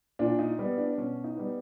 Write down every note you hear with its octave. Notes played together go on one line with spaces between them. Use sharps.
A#2 D4
D#4
G3 B3
D4
B2 C#4
D#4
G3 B3